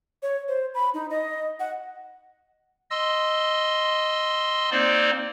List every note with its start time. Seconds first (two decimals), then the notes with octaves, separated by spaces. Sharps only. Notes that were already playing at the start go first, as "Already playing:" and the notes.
0.23 C#5
0.48 C5
0.74 B5
0.94 D#4
1.10 D#5
1.60 F#5
2.91 D#5 C6 E6
4.71 A#3 C4 D#4 C5 D5